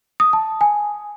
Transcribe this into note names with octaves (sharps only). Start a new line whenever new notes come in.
D#6
A5
G#5